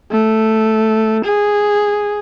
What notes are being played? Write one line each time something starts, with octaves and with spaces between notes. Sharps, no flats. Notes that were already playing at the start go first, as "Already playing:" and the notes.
A3
G#4